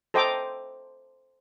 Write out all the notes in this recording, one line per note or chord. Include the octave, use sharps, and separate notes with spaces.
A4 C5 D#5 G5 A#5 D6